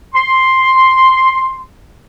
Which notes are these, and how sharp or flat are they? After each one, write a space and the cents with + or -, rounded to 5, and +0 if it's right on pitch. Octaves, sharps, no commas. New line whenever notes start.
C6 +5